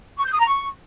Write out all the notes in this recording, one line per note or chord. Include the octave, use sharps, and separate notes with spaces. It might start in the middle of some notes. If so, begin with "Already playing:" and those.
C#6
G6
D#6
A#5
C#6